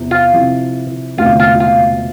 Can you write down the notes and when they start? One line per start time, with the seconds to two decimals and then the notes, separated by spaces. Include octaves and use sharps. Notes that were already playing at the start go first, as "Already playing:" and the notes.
Already playing: E2 C3 F3
0.11 F4
0.32 C3 F3 C4 E4
1.17 E1 D2 C3 F4
1.40 F4
1.60 F4